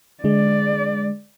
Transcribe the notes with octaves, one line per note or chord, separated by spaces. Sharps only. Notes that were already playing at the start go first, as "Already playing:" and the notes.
D3 G#3 D5